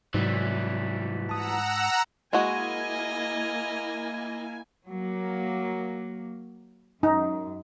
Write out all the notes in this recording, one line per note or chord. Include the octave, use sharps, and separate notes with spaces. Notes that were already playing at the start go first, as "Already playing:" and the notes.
G#2 C3 E3 F#3 G3 F#4
F#5 A5 A#5 D#6 E6
G#3 A#3 E4 F#4 D#5 G#5
F#3 A#3
F#2 D#4